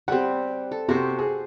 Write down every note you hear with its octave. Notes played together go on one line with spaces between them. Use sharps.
G3 C4 G4 F#5
A4
C3 F#4 G4 C5
G#4